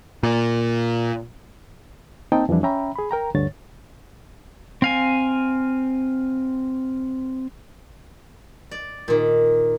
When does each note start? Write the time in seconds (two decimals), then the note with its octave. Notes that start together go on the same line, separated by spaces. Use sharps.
0.23 A#2
2.32 A#3 C4 D#4 G5 A5
2.49 F2 E3 F3 G3 D4 E4
2.63 C#4 E5 G5 A#5 B5
2.96 G#4 B5
3.11 A#4 G5 A#5
3.34 D2 G2 D3 C#5 A6
4.82 C4 F5 G#5
8.71 D5
9.08 A#2 D#3